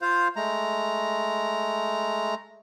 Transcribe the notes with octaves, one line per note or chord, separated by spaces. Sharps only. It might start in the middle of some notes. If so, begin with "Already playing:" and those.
F4 C5 F5
G#3 A3 A#5